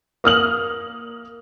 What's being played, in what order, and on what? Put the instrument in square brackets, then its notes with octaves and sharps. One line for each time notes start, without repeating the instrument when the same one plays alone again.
[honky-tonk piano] A#3 D#6 F6 F#7